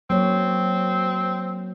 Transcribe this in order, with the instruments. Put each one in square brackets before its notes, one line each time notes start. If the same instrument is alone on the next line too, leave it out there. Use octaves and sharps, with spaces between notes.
[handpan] F#3 A#3 C#5 [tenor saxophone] C4